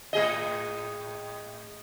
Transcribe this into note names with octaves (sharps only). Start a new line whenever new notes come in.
A2 G#4 D#5